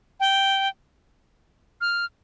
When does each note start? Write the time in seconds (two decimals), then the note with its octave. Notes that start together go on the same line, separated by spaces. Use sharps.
0.20 G5
1.81 F6